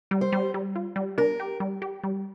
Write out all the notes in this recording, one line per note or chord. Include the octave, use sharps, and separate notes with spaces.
G3
C5
G3
G3
F4
G3
D4 A#4
G4
G3
G4
G3